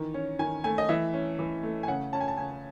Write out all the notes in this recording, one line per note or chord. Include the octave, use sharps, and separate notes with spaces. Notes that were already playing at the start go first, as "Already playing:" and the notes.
Already playing: D#3 E3
C#4
D#3 G#5
A3 G#5
D#5
E3 E5
C#4
E3
A3
G#5
C#3 F#5
C#4 A5
G#5
A5
C#3 G#5